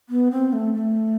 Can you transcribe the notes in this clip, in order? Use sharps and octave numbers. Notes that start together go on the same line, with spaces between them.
B3
C4
A3
A3